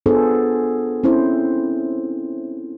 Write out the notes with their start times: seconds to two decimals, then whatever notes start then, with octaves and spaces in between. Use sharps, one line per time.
0.06 B3 D4 F4 G#4 A4 C5
1.04 C4 C#4 E4 C5